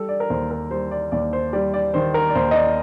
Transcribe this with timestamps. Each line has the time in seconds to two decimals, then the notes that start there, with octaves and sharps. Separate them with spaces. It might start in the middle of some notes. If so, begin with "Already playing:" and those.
Already playing: G3 A4
0.09 D5
0.20 A#4
0.30 D#2 C5
0.51 A#4
0.71 G3 C5
0.91 D5
1.12 D#2 D5
1.33 C5
1.53 G3 D5
1.74 D5
1.94 D#3 C5
2.14 A#4
2.29 D5
2.35 D#2 C5
2.51 D#5
2.55 D5